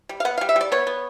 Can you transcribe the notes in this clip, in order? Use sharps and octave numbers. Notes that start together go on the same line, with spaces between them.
G3
F5
B3 F#5
G3 F5
E5
G3 D5
B3 C#5
B3